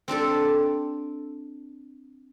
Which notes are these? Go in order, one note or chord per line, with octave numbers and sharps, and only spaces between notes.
C4 D4 G4 A4